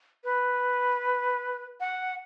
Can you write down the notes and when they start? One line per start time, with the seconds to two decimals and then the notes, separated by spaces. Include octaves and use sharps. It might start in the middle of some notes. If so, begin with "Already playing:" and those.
0.24 B4
1.80 F#5